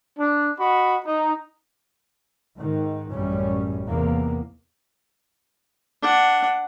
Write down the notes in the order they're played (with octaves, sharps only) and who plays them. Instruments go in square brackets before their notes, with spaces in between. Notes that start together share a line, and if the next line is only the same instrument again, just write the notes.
[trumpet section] D4
F#4 D#5 B5
D#4
[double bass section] G#2 D#3
A1 F#2 A2 G3 C#4
E2 C3 A#3 B3
[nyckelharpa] D4 F#5